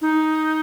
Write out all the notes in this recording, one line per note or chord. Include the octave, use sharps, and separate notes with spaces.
D#4